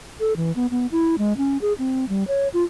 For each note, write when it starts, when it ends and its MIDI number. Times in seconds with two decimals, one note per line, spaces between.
0.20 0.33 69
0.37 0.54 52
0.56 0.66 59
0.71 0.86 59
0.92 1.15 64
1.18 1.37 56
1.37 1.57 61
1.62 1.73 68
1.78 2.08 60
2.09 2.24 55
2.28 2.48 73
2.54 2.63 65